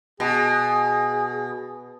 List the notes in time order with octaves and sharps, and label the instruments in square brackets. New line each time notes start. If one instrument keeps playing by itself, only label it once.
[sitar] B2 [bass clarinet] G#4